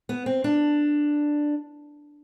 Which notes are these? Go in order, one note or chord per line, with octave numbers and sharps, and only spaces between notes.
B3
C4
D4